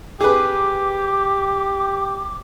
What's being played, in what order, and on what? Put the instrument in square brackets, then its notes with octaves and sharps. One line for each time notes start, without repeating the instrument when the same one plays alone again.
[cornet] G4 [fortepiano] G#4 B4 [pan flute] D6